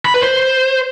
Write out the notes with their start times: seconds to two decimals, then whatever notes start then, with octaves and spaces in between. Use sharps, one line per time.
0.05 B5
0.14 B4
0.23 C5